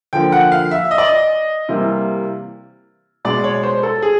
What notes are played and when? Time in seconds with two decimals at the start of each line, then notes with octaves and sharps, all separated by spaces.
0.13 D3 F3 A#3 G5
0.32 F#5
0.52 F5
0.71 E5
0.91 D#5
0.98 D5
1.05 D#5
1.69 C3 E3 G3 A#3
3.25 B2 G#3 D5
3.44 C#5
3.63 C5
3.83 A4
4.02 G#4